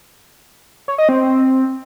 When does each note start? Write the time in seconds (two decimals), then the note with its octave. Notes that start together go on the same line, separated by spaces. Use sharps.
0.88 C#5
0.98 D#5
1.09 C4